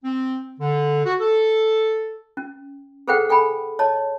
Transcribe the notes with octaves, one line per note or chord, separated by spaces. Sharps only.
C4
D3
F#4
A4
C#4
G#4 A4 B4 C5 F#5 G5
A4 G5 G#5 B5
C#5 D#5 A5